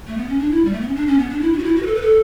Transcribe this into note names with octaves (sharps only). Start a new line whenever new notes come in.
A3
B3
C#4
D4
E4
G3
A3
B3
C#4
D4
C#4
B3
D4
E4
D4
F#4
E4
F#4
B4
A4
B4
A4